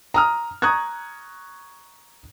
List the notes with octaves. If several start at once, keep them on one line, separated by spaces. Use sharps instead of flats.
A#5 D#6 F6
A#5 C#6 D#6 F#6 G#6